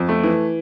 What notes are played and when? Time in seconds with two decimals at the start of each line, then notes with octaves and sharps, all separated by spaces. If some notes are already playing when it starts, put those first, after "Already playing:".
Already playing: F2
0.09 A3
0.23 E3